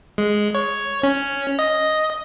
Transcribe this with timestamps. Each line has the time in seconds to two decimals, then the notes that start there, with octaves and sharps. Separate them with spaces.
0.18 G#3
0.55 C#5
1.03 C#4
1.59 D#5